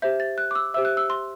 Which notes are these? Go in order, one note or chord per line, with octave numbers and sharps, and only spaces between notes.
G4 C5 E5 G6
A6
F#6
D6
E6
G4 C5 E5 E6
F#6
E6
C6